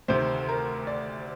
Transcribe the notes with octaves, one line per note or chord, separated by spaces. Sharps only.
D2 C3 D#3 C5
A#4
D5